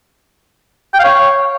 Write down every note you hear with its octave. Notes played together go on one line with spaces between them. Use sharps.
G5
F5
C#5